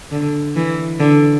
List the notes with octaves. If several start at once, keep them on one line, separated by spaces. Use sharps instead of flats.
D3
E3
D3